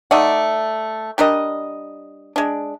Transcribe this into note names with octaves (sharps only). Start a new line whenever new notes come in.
A3 D#4 D5 F#5
G3 D4 A#4 D#5
G#3 D4